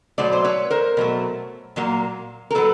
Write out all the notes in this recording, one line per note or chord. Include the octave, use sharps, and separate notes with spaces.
B2 F#3 A3 C5 D5
C5
B4 C#5
A#4 C5
B2 F#3 A3
A#2 F#3 A#3
A#4
A#2 F#3 A4 B4